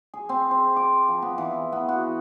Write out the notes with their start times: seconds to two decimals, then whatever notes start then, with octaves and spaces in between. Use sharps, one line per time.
0.14 G#4
0.29 C4
0.51 C5
0.76 D6
1.08 F3
1.22 B3
1.38 E3
1.72 B3
1.89 F#4